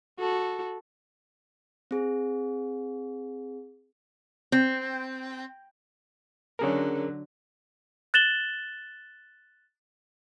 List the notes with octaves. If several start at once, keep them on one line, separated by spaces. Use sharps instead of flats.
F#4 A4
C4 G#4
C4
D3 F#3 C#4 G#4 A#4
F#6 A6 E7 F#7 G7